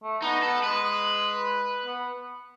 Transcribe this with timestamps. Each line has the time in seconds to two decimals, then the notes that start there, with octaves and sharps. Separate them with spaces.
0.03 A3
0.22 B3 D#4
0.43 B3 A4
0.63 G#3 B4
1.86 B3